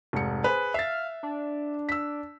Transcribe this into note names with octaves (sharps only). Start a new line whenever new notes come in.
F1 G#2 C#7
G#4 B4 C5
E5 F5 A6
D4
E6 B6